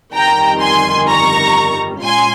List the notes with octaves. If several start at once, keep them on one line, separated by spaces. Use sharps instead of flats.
G1 F2 D#3 G3 G5 A#5
G#5 C6
A#5 C#6
A#2 G#3 C#4 F4 G#5 C6